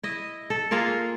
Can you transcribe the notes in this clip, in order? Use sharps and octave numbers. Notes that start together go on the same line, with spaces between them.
E4 D#5
A4
A#3 F4 G#4 A#4